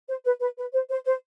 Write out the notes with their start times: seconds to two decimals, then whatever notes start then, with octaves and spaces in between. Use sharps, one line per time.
0.09 C5
0.25 B4
0.41 B4
0.57 B4
0.73 C5
0.90 C5
1.05 C5